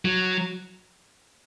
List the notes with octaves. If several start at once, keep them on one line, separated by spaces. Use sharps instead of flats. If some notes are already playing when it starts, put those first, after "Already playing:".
F#3